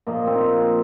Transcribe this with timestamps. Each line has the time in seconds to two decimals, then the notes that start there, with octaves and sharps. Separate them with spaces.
0.06 A#2 F3 A#3 D#5
0.27 C4
0.34 D#4